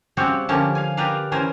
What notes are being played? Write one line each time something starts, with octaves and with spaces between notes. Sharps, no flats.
C#3 G3 C4 F#4 G4
D3 F3 A#3 C#4 G4 A5
F5 G#5
G4 A#4 B4 D5 F5
E3 C#4 A#4 C5 G#5